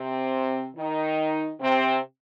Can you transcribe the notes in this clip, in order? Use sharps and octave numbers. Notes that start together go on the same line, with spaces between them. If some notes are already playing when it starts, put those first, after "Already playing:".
Already playing: C3 C4
D#3 D#4
C3 C4